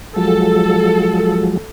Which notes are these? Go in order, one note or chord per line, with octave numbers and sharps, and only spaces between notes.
F3 F#3 G#3 A4